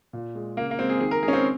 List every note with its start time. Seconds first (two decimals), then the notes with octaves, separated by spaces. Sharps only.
0.13 A#2
0.35 G#3
0.57 C#3 A#3
0.71 A#3
0.79 G#3 C4
0.89 G#4
1.00 D#3 G#4
1.11 A#4
1.23 G#3 G#4
1.28 C#4
1.33 C4